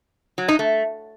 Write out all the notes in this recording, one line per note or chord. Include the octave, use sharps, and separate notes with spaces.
F#3
D#4
A3